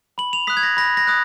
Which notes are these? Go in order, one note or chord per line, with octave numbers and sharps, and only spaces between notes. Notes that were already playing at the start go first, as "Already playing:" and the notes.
B5 F#7
F7
D#6 F#6 B6
G#6
A#6
B5 A#6
A#6
D#6 F#6